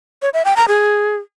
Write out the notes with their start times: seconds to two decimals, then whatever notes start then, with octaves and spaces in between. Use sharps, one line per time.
0.22 C#5
0.34 E5
0.45 G5
0.57 A#5
0.68 G#4